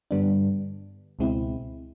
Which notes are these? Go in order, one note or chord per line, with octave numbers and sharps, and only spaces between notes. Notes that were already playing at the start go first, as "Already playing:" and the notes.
G2 D3 G3 B3 D4
C#2 B2 G#3 C4 E4